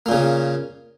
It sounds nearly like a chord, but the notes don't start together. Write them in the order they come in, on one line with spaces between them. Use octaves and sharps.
A#3 A#2 C#3